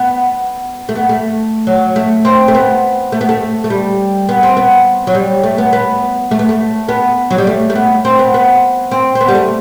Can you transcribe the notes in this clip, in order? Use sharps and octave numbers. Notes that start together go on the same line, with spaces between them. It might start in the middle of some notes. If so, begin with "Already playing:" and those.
Already playing: B3
A3
B3
A3
F#3
A3
C4
A3
B3
A3
B3
A3
A3
G3
B3
C4
B3
F#3
G3
A3
B3
B3
A3
B3
A3
B3
F#3
G3
A3
A3
B3
C4
B3
B3
C4
C4
B3
G3
A3